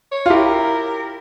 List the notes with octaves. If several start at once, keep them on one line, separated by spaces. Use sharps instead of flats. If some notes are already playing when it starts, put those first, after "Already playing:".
C#5
F4
E4 G4 A#4